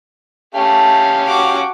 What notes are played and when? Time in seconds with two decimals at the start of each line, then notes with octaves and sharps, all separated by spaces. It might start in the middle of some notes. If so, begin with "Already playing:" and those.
0.55 A3 C#4 G4 F5
1.27 F#4 D6